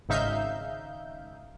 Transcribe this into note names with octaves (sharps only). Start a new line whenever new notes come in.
G#1 C#3 D#4 E5 F5 G6